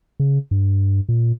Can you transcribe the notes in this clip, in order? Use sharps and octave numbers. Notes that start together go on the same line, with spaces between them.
C#3
G2
A#2